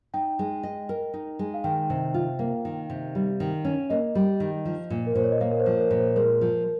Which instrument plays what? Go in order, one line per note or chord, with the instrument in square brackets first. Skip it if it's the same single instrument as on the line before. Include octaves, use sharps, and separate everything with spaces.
[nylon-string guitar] D#4 [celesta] G5
[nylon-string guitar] G#3
D#5
A#4
D#4
G#3
[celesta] F5
[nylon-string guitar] D#3 [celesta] G5
[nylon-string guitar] C3
F4
[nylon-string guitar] A#3 [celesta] F5
[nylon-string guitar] D#3
C3
G3
D#3
C#4
[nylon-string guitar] A#3 [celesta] D#5
[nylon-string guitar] G3
D#3
F3
A#2
[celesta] A#4
[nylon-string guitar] A#2 [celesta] C5
[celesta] C#5
D#5
[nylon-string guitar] A#3 [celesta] F5
[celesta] A#4
C5
[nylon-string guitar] F3
[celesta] A#4
[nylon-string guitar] A#2
[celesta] C5
[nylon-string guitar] G#3 [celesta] A#4
[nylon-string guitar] F3